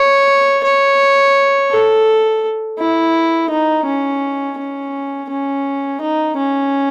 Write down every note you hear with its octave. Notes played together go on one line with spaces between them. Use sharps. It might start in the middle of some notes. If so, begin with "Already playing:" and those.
Already playing: C#5
C#5
A4
E4
D#4
C#4
C#4
C#4
D#4
C#4